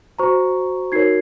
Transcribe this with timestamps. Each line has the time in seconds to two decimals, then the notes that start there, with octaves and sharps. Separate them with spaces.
0.19 F#4 C5 A#5 C#6
0.92 D#4 F#4 A#4 C#5 G#6 C7